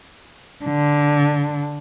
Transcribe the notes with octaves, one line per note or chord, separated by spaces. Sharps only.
D3